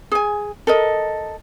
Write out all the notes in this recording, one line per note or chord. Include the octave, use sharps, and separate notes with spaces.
G#4 G#5
A4 A#4 D#5